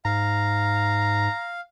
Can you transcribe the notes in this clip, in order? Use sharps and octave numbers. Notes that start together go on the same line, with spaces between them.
G#2 F5 A#5